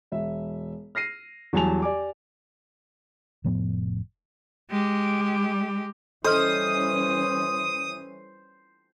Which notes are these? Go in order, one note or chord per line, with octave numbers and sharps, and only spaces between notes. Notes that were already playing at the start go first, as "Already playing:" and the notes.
E1 E5
F6 A#6 C7 D#7
E2 F#3 G3 G#5 A5 F7
G4 D5 G#5 D6
F1 A2 F3 B3
G#3 G4
E3 G3 C#4 A4 C5 D#5 D#6 F6